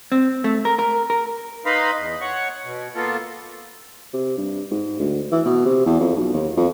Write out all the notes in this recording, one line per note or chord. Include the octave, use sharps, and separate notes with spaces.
C4
A3
A#4
A#4
A#4
D#4 B4 D#5 F5 B5 C6
E2
C#5 F#5 C#6
B2
A#3 B3 F4 A4
C3
G2
G#2
D2
E3
B2
C3
E2
F2
B1
D#2
F2